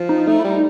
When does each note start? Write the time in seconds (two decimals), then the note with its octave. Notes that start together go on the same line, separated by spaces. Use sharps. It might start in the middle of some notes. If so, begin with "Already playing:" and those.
Already playing: F3
0.09 D#4
0.27 A3 D#4
0.39 G3 E4
0.50 D#4